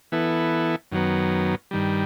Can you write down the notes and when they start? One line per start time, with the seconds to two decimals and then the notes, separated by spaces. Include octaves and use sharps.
0.12 E3 B3 E4 A4
0.92 F#2 D#3 F#3 B3
1.71 G2 D#3 G3